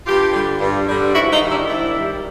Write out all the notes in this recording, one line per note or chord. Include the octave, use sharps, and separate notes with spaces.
G2 F4 G4
D3 G3
G2
D3 G3
G#2 E4 F#4
D#4 F4
D#3 G3
D4 E4
G#2 D4 E4
D#3 G3